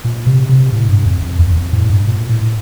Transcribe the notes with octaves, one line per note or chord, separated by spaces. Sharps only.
A#2
C3
C3
A2
G2
F2
F2
E2
E2
F2
A2
G2
A#2
A2